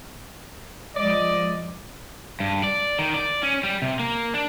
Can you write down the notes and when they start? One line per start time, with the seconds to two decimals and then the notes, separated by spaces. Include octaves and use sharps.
0.95 F3 G#3 D5 D#5
2.40 G2
2.64 D5
2.98 D#3
3.14 D5
3.43 C#4
3.64 G3
3.82 C3
3.99 A#3
4.34 D4